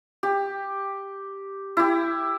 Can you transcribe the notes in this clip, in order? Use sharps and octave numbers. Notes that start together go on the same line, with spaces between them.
G4
E4 G4